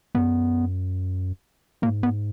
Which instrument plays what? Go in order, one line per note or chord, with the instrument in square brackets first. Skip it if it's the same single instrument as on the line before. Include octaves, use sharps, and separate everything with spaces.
[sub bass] F#2 [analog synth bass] B3
[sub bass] G#2 [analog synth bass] A#3
[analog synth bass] B3